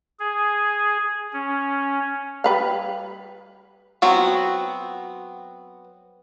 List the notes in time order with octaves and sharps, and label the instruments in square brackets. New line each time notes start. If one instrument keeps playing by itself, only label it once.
[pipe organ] G#4
C#4
[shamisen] G3 B4 F5
[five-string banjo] F#3 B3 C4 F#4